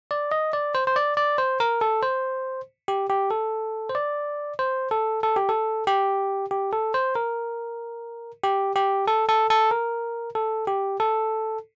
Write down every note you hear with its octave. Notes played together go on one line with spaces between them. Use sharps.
D5
D#5
D5
C5
C5
D5
D5
C5
A#4
A4
C5
G4
G4
A4
C5
D5
C5
A4
A4
G4
A4
G4
G4
A4
C5
A#4
G4
G4
A4
A4
A4
A#4
A4
G4
A4